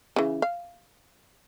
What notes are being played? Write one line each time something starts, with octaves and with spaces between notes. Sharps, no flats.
C#3 E3
F5